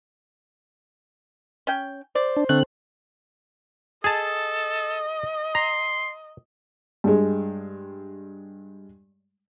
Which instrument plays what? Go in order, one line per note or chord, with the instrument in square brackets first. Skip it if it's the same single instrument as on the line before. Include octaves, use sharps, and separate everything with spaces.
[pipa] C#4 G5
[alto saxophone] C5 [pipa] D5
[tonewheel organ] D4
[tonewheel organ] D3 C4 F#6 [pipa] A3
[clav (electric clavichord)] G#4 A5 [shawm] A4 [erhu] D#5
[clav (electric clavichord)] A#5 [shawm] C6
[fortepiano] G2 G#3